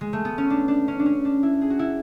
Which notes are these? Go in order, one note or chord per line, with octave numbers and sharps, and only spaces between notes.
G#3
A3
B3
C#4
D4
D4
C#4
D4
C#4
D4
E4
G#4
F#4
E4